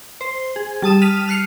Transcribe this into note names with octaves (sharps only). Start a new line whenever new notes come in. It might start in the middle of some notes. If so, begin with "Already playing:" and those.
C5
G#4
G3 A5 D#6 E7
A5 F6 B6 D#7 F7
F6 F#6 C7 C#7 F7